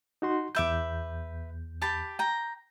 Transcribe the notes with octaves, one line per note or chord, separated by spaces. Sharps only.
D#4 F#4 C6
E2 B4 E5 D6 G6
G4 A5 B5
G5 A#5